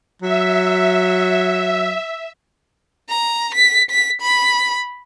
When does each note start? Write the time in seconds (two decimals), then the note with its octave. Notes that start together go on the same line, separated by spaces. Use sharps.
0.22 F#3 E5
3.09 A#5
3.55 B6
3.91 B6
4.22 B5